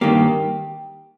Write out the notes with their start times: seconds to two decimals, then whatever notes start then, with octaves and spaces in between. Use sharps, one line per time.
0.01 G2 D#3 A#3 G4